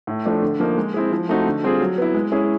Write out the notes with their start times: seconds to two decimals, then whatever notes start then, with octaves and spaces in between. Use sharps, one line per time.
0.07 A2
0.26 F3 A3 D4
0.42 D3
0.60 F3 A#3 D#4
0.77 G#3
0.94 C4 E4 G#4
1.12 F3
1.29 A3 C4 D#4 F#4
1.46 D3
1.63 G3 C4 F4 G#4
1.80 F#3
1.98 B3 E4
2.14 G#3
2.32 C#4 E4 G#4